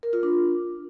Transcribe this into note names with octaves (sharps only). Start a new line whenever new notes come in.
A#4
F4
D4